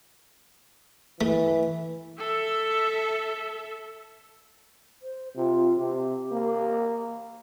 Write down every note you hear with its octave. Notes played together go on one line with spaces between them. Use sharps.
E3 A3
A4 E5
C5
C3 F4
C3 G4
A#3